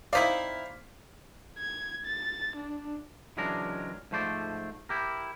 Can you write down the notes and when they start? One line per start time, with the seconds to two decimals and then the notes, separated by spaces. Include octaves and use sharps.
0.13 C4 D#4 E4 C5 D5 F5 B6
1.58 G#6
2.06 A6
2.56 D4
3.37 C#2 E3 F#3 G#3 D4 A#4
4.11 G#2 F3 A3 C5 D5
4.89 E4 G4 A#4